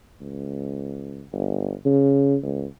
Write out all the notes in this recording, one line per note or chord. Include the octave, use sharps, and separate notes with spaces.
C#2
G1
C#3
C#2